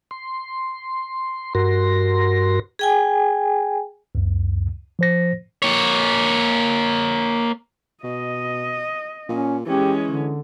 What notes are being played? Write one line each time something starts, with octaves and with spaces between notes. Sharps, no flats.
C6
G2 F#4 A#4 C6 A#6
G#4 G5 G#5
C#2 F#2
F3 C5 A#6
A#3 C#5
B2 D#5
A#2 C#4
E3 G#3 C#4 G4
D3